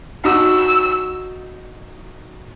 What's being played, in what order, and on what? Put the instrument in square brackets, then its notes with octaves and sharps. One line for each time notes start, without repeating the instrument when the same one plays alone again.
[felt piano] D#4 F#4 [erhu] E6